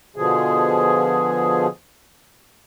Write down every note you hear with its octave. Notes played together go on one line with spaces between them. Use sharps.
B2 D3 F3 G#4